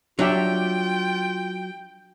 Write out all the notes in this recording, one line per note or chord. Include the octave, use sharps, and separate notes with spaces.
F#3 D4 F4 G4 E5 G5